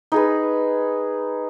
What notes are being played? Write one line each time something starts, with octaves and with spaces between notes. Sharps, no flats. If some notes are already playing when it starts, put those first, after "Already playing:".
D#4 G#4 B4